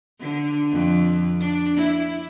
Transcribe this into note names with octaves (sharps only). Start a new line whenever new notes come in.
D3
F2
D4
E4